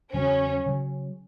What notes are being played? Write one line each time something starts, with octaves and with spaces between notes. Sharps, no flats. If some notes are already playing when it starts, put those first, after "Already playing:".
E2 C#3 F#3 C#4
C#3 F#3